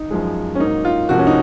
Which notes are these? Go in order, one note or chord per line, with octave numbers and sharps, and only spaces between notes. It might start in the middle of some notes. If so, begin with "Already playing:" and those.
Already playing: D#4
F#2 F3 G#3
C#4
G#2 F#3 A#3 D#4
F4
C#2 C3 F3 A#3 F#4
C#4
D#4